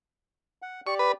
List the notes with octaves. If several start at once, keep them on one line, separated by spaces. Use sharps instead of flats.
F#5
G4 D5 C#6
B4